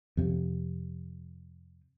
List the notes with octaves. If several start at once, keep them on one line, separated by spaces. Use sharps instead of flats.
F2 C3